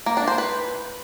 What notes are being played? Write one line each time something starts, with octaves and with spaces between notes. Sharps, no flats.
A#3
D4
C5
B4